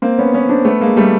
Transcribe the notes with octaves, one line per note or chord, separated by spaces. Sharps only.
A#3 C4
B3 C#4
B3 C#4
C4 D4
A3 B3
G#3 A#3
G3 A3